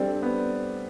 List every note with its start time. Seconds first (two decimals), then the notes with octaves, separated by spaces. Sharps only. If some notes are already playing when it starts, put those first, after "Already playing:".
Already playing: G3 C4 D4 A4
0.22 B3